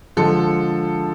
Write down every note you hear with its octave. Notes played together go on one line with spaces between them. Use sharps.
D3 F3 G#3 A4